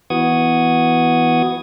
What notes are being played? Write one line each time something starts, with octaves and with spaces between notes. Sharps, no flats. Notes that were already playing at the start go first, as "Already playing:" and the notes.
E3 B3 F#4 F#5 D#6 G#6